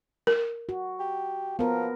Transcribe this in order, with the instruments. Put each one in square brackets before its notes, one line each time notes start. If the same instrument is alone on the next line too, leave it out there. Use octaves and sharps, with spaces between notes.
[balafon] A#4
[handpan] F#4
[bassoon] G4
[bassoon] F3 [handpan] B3 A#4